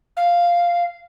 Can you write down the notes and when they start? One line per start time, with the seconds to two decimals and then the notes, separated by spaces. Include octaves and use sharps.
0.16 F5